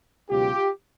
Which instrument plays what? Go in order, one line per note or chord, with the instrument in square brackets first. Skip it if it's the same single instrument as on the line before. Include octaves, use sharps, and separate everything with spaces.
[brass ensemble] C#2 B2 F#3 F4 G4